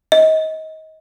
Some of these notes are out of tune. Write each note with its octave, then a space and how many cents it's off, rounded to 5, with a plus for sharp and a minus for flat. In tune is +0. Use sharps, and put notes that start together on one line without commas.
D#5 +25